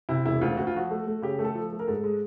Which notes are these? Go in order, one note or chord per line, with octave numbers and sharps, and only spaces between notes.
C3 E4
E1 E4
D2 F4
D2 F#4
F4
F3 F#4
A3
A3
C#3 G4
A3
A4
F3
A3
A#4
G#2 A4
G#3